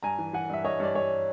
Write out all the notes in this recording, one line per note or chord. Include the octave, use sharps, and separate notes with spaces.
G2 G#5 A#5
E3
E3 F#5 G#5
G2 E5
G2 C#5 D#5
G2 D5
G2 C#5